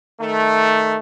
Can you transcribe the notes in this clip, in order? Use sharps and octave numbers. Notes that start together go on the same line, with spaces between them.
D#3 A3